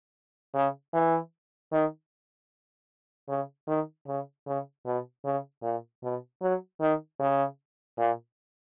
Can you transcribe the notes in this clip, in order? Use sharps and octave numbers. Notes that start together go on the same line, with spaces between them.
C#3
E3
D#3
C#3
D#3
C#3
C#3
B2
C#3
A#2
B2
F#3
D#3
C#3
A#2